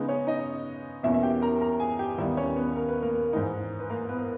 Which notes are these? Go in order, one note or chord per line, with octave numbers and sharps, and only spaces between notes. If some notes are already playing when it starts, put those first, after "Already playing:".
Already playing: C#3 G#3 B3 D#4
C#4 C#5
D#4 D#5
E2 B2 A#3 C#4 E4 E5
E5
G4 G5
A#4 A#5
A#4 A#5
G#4 G#5
G4 G5
D#2 D#3 G3 B3 E4 E5
C#4 C#5
B3 B4
A#4
B4
A#3 A#4
G#2 E3 G#3 D#4
B4
A#3 A#4
B3 B4